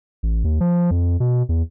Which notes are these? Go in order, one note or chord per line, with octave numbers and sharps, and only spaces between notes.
A1
D#2
F3
F2
B2
E2